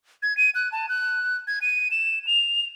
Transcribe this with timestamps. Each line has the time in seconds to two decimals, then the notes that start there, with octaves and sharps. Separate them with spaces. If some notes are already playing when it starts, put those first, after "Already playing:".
0.22 G#6
0.37 D#7
0.55 F#6
0.72 A5
0.89 F#6
1.47 G#6
1.62 D#7
1.91 E7
2.27 F7